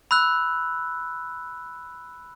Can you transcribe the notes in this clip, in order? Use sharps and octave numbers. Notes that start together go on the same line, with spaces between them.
B5 E6 F#6